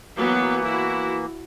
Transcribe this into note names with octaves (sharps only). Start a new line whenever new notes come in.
E3 F#3 A#3 B3
E4 F#4